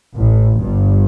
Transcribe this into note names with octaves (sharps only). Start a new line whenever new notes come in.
A1 A2
G1 G2